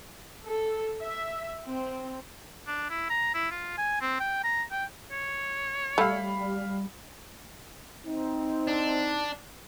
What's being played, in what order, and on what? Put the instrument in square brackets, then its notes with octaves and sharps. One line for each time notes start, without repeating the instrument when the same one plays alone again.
[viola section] A4
E5
C4
[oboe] D4
E4
A#5
E4
F4
G#5
C4
G5
A#5
G5
[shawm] C#5
[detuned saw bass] G3 [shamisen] A3 [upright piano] F5 B5
[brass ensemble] C4 D#4
[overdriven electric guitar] D4